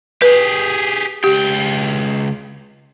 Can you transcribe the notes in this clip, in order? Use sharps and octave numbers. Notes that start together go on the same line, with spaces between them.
G4 G#4 B4
C#2 G4 G5